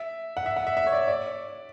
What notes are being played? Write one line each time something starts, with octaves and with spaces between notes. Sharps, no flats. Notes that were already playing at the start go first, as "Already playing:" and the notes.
Already playing: E5
F#5
E5
F#5
E5
E5
C#5
D5
D5